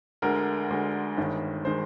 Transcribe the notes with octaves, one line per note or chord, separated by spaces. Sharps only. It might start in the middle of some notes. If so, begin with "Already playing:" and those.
D2 D3 G#3 A#4
D2 D3 G#3
G1 G2 D#3 G#3
D#3 G#3 C5